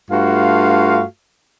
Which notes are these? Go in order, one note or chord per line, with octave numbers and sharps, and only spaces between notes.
G2 A3 F4 F#4 F5